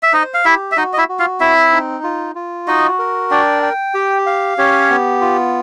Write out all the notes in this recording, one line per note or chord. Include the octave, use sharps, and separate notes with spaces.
E5
D#4 C5 D#5
F5
E4 G4 E5
E5
D#4 F#4 D#5
D#5
E4 E5
F#4
F4 F5
C4 E4 E5
D#4
F4
F4
D#4 F#4 D#5
A#4
D4 D5 G5
G5
G4
F5
C#4 G4 C#5
B3
F4